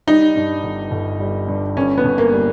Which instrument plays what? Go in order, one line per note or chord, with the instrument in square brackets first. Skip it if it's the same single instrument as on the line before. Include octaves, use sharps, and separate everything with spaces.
[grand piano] G3 [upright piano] D#4
[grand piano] G2
G1
G1
G3
G2
[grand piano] G1 [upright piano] C#4
[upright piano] B3
[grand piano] G1
[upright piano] A#3
[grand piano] G3